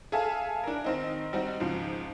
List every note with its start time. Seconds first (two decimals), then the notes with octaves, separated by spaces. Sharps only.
0.12 G#4 A4 E5 F5 G#5 A5
0.64 D4 A#4
0.84 D#3 C4 D#4
1.33 G3 C4 D#4 F#4
1.60 C#2 G#2 F3